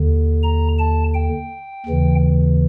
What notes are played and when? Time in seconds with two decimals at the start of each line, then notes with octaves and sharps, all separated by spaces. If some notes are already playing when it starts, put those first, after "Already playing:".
Already playing: D#2 D3
0.43 A#5
0.79 A5
1.15 G5
1.86 D#2 C#3 E3